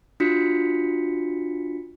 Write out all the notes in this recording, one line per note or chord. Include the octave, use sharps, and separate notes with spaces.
D4 F4 F#4 B6 C#7